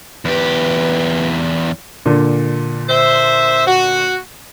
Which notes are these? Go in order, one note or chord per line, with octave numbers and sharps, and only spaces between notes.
E2 G4 B4
A#2 D3
C5 E5
F#4